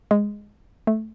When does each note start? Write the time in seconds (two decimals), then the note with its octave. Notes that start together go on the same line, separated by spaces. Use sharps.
0.11 G#3
0.87 A3